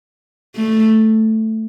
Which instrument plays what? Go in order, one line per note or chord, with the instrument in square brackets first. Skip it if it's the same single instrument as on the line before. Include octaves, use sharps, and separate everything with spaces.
[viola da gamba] A3